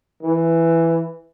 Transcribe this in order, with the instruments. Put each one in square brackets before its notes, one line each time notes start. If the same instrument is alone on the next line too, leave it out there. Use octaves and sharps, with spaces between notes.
[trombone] E3